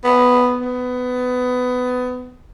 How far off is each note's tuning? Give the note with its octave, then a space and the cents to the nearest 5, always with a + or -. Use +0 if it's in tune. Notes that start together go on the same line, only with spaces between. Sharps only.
B3 +5
B3 +20